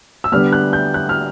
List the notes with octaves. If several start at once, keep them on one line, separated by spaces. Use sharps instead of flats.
E6
D3 G3 B3 F6
F#6
G6
F#6
F6